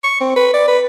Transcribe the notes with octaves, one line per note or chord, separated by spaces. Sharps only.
C#6
C4
B4
D5
B4